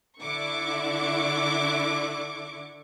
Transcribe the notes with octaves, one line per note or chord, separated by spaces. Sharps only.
D3 D4 E4 C#6 D6